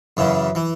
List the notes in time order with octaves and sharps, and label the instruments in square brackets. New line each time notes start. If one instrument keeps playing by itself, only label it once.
[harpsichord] F#2 C#3 E3
E3